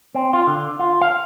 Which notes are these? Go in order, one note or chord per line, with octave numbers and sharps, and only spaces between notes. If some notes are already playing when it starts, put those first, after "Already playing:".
C4
F4
D3
F4
F5